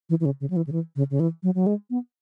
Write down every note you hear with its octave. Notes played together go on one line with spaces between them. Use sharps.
E3
E3
C#3
C#3
F#3
E3
C#3
E3
C#3
C#3
E3
F#3
F#3
G#3
B3